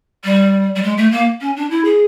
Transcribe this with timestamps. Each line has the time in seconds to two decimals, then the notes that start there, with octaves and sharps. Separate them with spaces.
0.24 G3
0.75 G3
0.82 G#3
0.97 A3
1.11 A#3
1.41 C#4
1.56 D4
1.70 E4
1.84 G#4